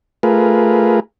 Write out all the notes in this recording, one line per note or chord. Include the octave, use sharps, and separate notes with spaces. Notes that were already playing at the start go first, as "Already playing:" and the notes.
A3 F4 G#4 A#4 B4